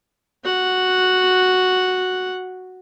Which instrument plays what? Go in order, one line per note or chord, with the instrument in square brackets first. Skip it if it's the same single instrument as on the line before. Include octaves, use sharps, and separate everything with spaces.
[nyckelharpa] F#4 F#5